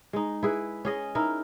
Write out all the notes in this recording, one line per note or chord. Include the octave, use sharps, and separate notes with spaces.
G#3 D#4
E4 G#4 B4
C#4 G#4 D#5
D#4 E4 A#4